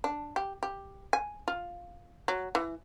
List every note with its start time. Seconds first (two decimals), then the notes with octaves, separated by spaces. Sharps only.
0.04 D4
0.36 G4
0.63 G4
1.13 G#5
1.48 F4
2.28 F#3
2.55 E3